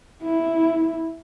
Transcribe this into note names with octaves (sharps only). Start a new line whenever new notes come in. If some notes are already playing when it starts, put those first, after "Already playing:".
E4